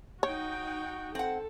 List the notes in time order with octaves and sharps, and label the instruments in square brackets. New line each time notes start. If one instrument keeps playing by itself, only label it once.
[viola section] D#4 G5 [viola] F#4 [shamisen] C#5
[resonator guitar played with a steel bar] C4 F#5 [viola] A4